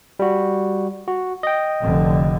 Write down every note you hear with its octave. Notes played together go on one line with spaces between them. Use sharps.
G3 F#4
F#4
D#5 G5
F1 D3